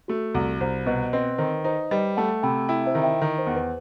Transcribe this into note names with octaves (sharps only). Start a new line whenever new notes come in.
A3 F#4
C2 F#4
C2 C5
B2 B4 D#5
C4 B4 D#5
D#3 C5
D#4 C5
G3 B4 D#5
A3 F#5 A5
C3 G5 B5
E4 E5 G5
C5 E5
D#3
E5 G5
D#3
C5
E2
B4